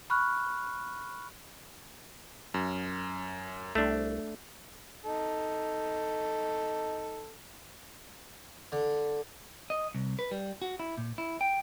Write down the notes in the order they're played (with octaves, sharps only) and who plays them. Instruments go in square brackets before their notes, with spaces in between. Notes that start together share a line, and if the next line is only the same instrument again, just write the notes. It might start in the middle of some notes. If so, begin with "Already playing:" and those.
[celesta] B5 C#6 F6 F#6
[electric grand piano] F#2
[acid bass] C2 [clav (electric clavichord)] A3 D4
[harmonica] D#4 A4
[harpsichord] D3
[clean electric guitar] D#5
C2
B4
G3
F#4
E4
A#2
E4
G5